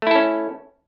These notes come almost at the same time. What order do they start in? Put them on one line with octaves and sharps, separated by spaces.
A3 E4 A4 C#4